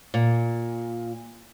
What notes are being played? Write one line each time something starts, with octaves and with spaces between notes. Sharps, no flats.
A#2